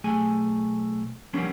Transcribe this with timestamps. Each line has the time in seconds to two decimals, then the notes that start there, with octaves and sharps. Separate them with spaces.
0.04 B1 A3 G#4 G#5
1.33 F3 G3 A#3 B3 C#4 D4